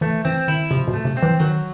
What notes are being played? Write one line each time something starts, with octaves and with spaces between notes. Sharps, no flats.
E3 A3
E3 C4
D#3 E4
C3 F3
B2
A3
C3
C4
E3
D#3 F#3